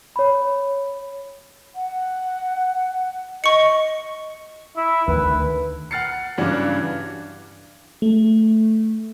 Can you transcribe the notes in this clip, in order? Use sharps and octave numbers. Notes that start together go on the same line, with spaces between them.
C#5 B5
F#5
D#5 C#6 C#7
E4
D2 D#3 B4
F#5 F6 A6 C7 C#7
G2 C#3 E3 F#3 D4
A3